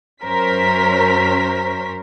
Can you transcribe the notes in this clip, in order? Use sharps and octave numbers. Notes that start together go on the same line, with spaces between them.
F#2 C#4 A#4 C5 B6